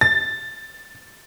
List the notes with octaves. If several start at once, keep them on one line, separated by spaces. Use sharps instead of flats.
A6